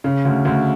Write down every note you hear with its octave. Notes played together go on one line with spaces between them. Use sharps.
C#3
D2
D2